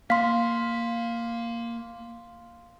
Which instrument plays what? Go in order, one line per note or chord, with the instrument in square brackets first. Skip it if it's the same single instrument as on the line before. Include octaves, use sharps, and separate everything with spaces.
[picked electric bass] A#3 [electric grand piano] F5 [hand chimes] C6 B6